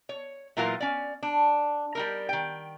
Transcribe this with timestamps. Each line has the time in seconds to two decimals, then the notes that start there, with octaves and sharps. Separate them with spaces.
0.09 C#5
0.57 A#2 E3 F#3 F4 A#4 A#5
0.80 C#4 D5
1.23 D4
1.95 G3 D#4 A#4
2.29 D#3 G5